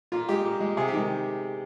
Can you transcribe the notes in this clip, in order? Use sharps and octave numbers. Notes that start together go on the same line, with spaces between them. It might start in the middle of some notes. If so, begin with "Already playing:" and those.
A#2 F4
G#3 G4
A#2
G#3
C3 G#4
G4
D#3 G#3